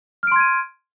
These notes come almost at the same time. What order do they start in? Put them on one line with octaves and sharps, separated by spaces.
F6 D7 C6 G#6 D#7